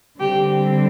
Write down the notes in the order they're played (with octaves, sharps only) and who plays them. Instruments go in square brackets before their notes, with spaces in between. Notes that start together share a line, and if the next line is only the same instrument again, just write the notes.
[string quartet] D3 G3 C4 G4